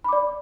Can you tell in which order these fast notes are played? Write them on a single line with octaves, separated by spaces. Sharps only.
B5 D6 D5